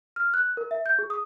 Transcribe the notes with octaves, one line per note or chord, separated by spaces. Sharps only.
F6
F#6
A#4
E5
G6
G#4
D#6